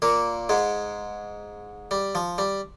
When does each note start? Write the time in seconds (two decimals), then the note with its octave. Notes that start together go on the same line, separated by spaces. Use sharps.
0.02 A#2 A#3
0.49 G#2 G#3
1.91 G3
2.15 F3
2.38 G3